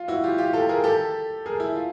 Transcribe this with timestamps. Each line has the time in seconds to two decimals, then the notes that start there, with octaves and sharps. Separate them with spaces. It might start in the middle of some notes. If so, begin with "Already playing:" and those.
Already playing: F4
0.08 E4 F#4
0.24 F4 G4
0.38 F4 G4
0.53 G4 A4
0.69 G#4 A#4
0.84 G4 A4
1.46 G#4 A#4
1.60 E4
1.76 F4